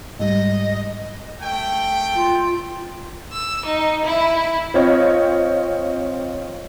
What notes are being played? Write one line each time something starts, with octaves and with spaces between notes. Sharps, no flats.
G#2 G3 D#5
A3 G5
F4
E6
D#4
E4
C4 F4 C#5 D#5